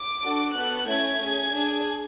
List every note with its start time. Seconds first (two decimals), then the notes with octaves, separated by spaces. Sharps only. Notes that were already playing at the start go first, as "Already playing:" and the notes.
Already playing: D6
0.22 D4 F#4 A4
0.54 B3 F#4 A4 F#6
0.87 A3 C#4 E4 G#6
1.19 C#4 G#4
1.52 D4 G#4